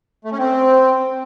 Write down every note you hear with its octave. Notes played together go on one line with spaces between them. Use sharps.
A3
C#4
C4